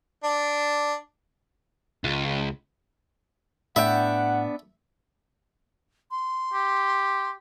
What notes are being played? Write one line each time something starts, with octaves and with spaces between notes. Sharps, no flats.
D4
C#2
A2 B3 D4 E5 F#5 G5
C6
G4